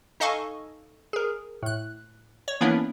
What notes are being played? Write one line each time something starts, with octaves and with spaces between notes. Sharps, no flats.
D#4 A4 D#5 F5 G#5 C#6
G#4 A#4
A2 F#6
C#5
E3 A#3 B3 C#4 D4 E4